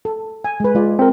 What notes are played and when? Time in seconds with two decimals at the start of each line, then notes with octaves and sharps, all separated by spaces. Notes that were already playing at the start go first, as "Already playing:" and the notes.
0.05 A4
0.44 G#5
0.60 G#3 B4
0.75 G#3 F4 D5
0.99 C4 A#4